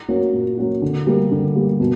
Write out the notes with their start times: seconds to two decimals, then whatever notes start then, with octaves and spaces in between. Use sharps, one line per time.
0.09 F#3 A#3 C#4 F#4
0.33 A#2
0.58 F#3 A#3 C#4 F#4
0.82 D3
1.07 G3 A#3
1.31 D3
1.55 G3 A#3
1.80 B2